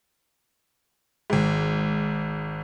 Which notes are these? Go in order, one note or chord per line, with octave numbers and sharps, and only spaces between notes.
G#1 G#2